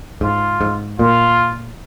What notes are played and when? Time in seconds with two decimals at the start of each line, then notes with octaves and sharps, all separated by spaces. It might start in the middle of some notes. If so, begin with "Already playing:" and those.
0.21 G#2 F4
0.61 G#2
0.99 A#2 F4